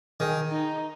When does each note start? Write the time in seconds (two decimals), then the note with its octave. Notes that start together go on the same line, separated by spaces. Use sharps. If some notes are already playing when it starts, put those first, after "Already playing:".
0.20 D#3 G#4
0.50 D#4